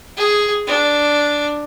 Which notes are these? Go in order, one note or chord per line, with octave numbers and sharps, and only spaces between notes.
G#4
D4